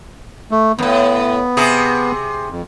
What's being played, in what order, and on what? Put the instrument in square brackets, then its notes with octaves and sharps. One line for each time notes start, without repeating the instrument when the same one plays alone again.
[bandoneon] A3
[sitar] F2 A2 [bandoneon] B3
[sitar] C3 G#4
[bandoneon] F2